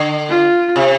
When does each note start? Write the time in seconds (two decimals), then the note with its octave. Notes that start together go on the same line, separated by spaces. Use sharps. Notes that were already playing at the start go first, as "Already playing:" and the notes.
Already playing: D3
0.29 F4
0.76 C3